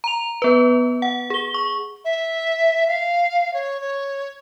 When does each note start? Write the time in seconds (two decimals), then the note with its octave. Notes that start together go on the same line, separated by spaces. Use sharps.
0.04 A#5 F7
0.42 B3 B4
1.02 F#5
1.30 G#4 G7
1.54 C#6
2.05 E5
2.88 F5
3.54 C#5
3.81 C#5